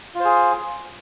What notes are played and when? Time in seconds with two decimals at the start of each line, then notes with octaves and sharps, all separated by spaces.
0.15 F4
0.20 C5
0.25 G#4